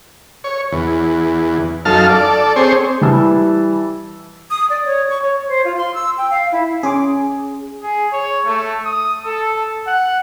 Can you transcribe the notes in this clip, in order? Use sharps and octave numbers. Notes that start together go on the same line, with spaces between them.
C#5
E2
F#2 D#4 A4 F5 A5 F6
A4 D5
C4 G#4 C5 C#5
E3 G3 A5 E6
D#6
D5
C#5
C#6
C#5
C5
F4
C6
E6
G5
F5
E4
C#4 G#4 C6 D6
G#4
C#5
A3
D#6
A4
F#5